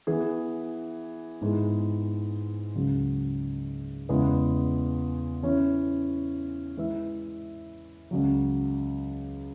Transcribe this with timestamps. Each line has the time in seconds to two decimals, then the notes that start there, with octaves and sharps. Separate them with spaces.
0.07 E3 B3 G#4
1.41 G#2 G#3 B3 E4 G#4
2.75 C#2 C#3 F#3
4.09 E2 C#3 G#3 B3 E4
5.43 E3 C#4 E4 C#5
6.77 E3 G#3 E4 B4 E5
8.11 C#2 C#3 F#3